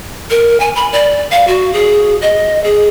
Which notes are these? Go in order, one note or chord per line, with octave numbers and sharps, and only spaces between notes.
A#4
G#5
B5
D5
F5
F#4
G#4
D#5
G#4